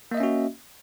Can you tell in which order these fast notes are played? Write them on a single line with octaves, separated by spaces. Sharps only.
A#3 D#5 E5 C#4 F#4